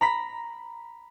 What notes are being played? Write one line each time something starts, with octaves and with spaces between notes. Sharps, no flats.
A#5 B5 B6